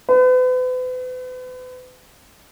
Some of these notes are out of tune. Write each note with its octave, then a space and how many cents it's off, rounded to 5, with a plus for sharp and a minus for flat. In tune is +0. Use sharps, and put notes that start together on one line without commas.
B4 +40